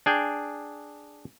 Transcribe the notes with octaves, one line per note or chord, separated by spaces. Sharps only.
D4 G#4 G5